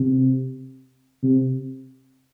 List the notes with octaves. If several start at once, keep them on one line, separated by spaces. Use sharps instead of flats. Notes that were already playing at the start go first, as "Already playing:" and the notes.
Already playing: C3
C3